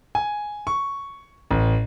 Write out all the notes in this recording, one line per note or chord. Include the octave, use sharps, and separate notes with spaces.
G#5
C#6
A1